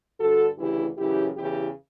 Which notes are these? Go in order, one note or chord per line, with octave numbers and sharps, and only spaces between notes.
G2 D3 F#4 A4
D2 C#3 E3 E4 G4
F#2 C#3 E3 E4 G4
E2 C#3 E3 E4 G4